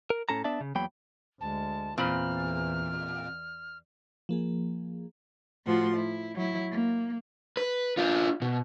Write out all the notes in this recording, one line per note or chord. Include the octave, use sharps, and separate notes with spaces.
A#4
A2 C#4 A4 A5 A#5
B3 D4 D5 E5 A5
C#3
E2 F#3 A#3 G5 B5
D2 G#3 A5
E2 A#2 E3 C4 C5 B5 F6
F3 A#3 G#4
A2 F3 F#4 C6
E4
F#3 E4
A#3
B4
D4 F4
B2